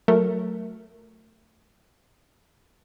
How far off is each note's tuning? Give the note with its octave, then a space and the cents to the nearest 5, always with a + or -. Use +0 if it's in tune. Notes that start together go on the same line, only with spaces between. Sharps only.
F#3 +0 A3 +10 A#4 +0